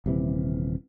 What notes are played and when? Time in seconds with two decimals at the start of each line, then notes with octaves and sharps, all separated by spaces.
0.06 D#1 C3 E3